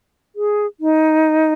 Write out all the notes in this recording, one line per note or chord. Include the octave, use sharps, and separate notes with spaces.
G#4
D#4